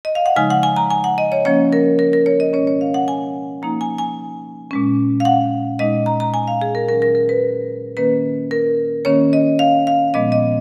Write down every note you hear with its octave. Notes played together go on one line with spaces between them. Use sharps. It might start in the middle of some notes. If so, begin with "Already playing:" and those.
D#5
F5
F#5
C#3 F3 G#3 D#4 G#5
F#5
G#5
A#5
G#5
F#5
D#5
C#5
F3 A#3 C#4 C#5
A#4
A#4
A#4
C#5
D#5
B2 G#3 C#4 C#5
C#5
F5
F#5
G#5
F3 A#3 D#4 A#5
G#5
G#5
A#2 G#3 C#4
F5
F#5
A#2 G#3 D#4 D#5
A#5
A#5
G#5
F5
G#4
A#4
D#3 F#3 C#4 A#4
A#4
A#4
B4
D#3 A#3 C#4 B4
A#4
D#3 A#3 C#4 C#5
D#5
F5
F5
A#2 F3 G#3 B3 D#5
D#5